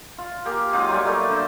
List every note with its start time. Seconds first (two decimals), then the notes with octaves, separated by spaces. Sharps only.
0.18 F4
0.45 A#3 G4 G#4 A#4
0.73 F#3 G#3 D#4 F4
0.89 F#3 G3 F4 G#5
1.05 A3 A#3 A#5
1.28 D3 C5 E5